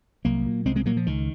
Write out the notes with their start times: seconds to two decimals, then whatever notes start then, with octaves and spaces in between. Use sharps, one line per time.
0.25 C2 F#3 A#3
0.46 A#2
0.65 C2 G#3 C4
0.76 G#3 C4
0.86 A#2 F#3 A#3
0.97 F3
1.06 C#2 D#3